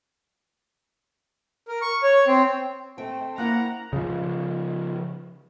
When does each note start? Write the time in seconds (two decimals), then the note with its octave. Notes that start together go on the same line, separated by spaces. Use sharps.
1.68 A#4
1.82 C#6
2.03 C#5
2.27 C4
2.98 A3 C4 G5
3.38 A#3 C#4 E4 A#4 F#5 A#5
3.93 C#3 F3